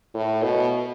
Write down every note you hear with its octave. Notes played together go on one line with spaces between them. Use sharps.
A2
B2